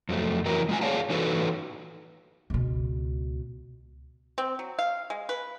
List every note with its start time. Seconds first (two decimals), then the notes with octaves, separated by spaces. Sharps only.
0.09 F2 F#3 A3
0.46 E3 F#3 E4 A#4
0.69 G#3 F4 G#5
0.81 G#4 B4 C#5 D5 F5 A5
1.10 E3 D#4 F#4 A4 B4 C#5
2.50 C#2 B2
4.38 C4
4.59 F#3
4.79 F5
5.10 G#3
5.29 B4